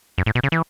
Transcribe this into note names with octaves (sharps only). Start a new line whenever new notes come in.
F#2
A2
B2
C#3
E3